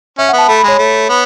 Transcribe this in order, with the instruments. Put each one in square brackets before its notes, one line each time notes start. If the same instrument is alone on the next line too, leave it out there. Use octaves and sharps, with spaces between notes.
[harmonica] C#4 [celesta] E5
[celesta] F#5
[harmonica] B3
[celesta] A5
[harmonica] A3 [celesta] B5
[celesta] B5
[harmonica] G#3 [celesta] C#5
[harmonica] A3
B3